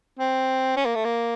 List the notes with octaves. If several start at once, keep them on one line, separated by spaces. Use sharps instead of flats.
C4
C#4
A#3
A3
A#3